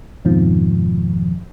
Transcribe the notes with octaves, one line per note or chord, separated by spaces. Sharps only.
F2 G#2 B2 D#3 F3